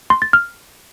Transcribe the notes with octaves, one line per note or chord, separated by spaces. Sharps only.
C6
A6
F6